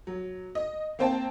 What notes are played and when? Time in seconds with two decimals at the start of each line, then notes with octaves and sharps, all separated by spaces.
0.07 F#3
0.55 D#5
0.99 A#3 C4 C5 G5 A5